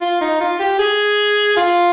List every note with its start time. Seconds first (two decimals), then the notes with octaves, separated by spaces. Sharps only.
0.01 F4
0.21 D#4
0.41 F4
0.60 G4
0.79 G#4
1.57 F4